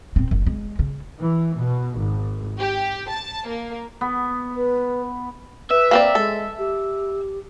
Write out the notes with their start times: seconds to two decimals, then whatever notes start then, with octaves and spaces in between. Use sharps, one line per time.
0.16 D1 C4
0.31 F#1
0.46 G#3
0.79 C#3
1.21 E3
1.56 B2
1.99 G#1
2.59 G4
3.09 A5
3.47 A#3
4.01 B3
4.56 B4
5.70 B4 E5
5.91 A#3 C4 D5
6.15 G#3 A4
6.59 G4